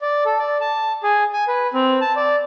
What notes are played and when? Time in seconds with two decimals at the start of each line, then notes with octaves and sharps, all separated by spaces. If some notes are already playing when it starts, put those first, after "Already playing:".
0.02 D5
0.26 A4
0.39 D5
0.61 A5
1.03 G#4
1.33 G#5
1.48 B4
1.74 C4
2.01 A5
2.16 D5